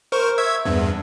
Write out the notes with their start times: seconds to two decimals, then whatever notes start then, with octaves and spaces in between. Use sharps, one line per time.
0.12 A#4 C5 C#6
0.38 E5 E6 G#6
0.65 E2 G2